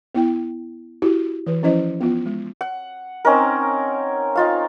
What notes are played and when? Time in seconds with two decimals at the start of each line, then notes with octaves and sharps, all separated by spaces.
0.15 B3 E4 G5
1.02 E4 F#4 G4
1.47 E3 B4
1.63 F3 C#4 E4 C5 D#5
2.01 B3 F4
2.26 G#3
2.61 F#5
3.25 C4 C#4 D#4 A#4
4.36 D#4 F4 F5